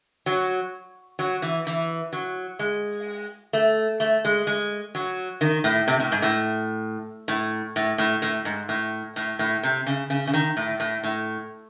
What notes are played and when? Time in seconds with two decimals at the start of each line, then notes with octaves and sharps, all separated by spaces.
0.26 F#3
1.19 F#3
1.42 E3
1.67 E3
2.13 F#3
2.59 G#3
3.53 A3
4.00 A3
4.25 G#3
4.47 G#3
4.95 F#3
5.41 D#3
5.64 A2
5.88 C3
5.99 A2
6.12 G#2
6.22 A2
7.28 A2
7.76 A2
7.98 A2
8.22 A2
8.45 G#2
8.69 A2
9.16 A2
9.39 A2
9.63 C3
9.86 C#3
10.10 C#3
10.27 C#3
10.33 D#3
10.57 A2
10.80 A2
11.04 A2